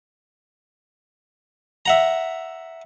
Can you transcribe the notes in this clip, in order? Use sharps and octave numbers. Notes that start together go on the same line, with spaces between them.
E5 F#5 A#5